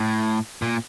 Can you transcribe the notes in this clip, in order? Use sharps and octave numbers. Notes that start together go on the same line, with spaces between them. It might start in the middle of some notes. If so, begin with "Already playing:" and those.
Already playing: A2
A#2